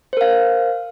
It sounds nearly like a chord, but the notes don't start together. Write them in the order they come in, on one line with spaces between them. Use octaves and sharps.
C5 A#4 F5